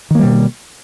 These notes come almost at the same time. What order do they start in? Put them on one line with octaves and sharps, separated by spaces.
D#3 A#3 G3 B2